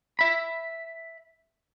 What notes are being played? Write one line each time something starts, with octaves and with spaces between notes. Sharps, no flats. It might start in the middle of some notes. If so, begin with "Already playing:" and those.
E5 B5